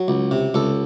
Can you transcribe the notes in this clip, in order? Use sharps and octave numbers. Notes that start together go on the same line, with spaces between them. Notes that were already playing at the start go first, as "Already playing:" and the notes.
Already playing: F#3
C#2
C3
C#2 A4